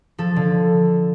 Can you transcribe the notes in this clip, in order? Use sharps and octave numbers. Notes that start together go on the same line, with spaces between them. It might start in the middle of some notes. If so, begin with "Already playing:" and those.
F3 A4
D3